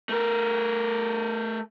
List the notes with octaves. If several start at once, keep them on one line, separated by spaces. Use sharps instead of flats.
A3 A#4